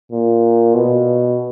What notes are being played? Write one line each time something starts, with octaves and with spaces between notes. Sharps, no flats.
A#2
B2